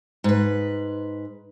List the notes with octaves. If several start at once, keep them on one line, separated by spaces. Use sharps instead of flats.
G#2 B4